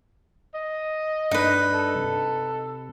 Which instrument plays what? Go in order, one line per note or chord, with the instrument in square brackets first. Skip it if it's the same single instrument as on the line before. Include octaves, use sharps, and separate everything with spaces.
[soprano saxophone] D#5
[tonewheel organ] G2 D4 [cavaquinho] D#4 B4
[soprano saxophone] A4
[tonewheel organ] C3